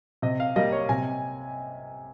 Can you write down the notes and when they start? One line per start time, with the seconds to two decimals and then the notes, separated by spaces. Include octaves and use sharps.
0.22 C3 D#5
0.40 F5
0.56 G3 A#3 D#5
0.72 C#5
0.89 C3 G#5